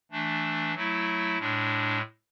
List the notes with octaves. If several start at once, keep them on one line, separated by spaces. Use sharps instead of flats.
E3 A3 D4
F#3 A3 E4
A2 G#3 D4